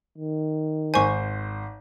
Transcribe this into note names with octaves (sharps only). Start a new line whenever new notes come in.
D#3
G#1 C5 G#5 C#6